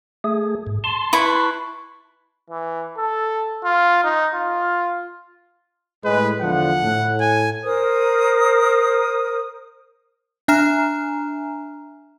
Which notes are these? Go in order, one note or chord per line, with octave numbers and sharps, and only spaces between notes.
A3 G#4
G#2
A5 C6
E4 B4 C#6
E3
A4
F4
D#4
F4
A2 G#3 B4
E2 D3 F3 F#5
A2
G#5
A#4 C5 D#6
D4 E5 G#5 A#5 F6 E7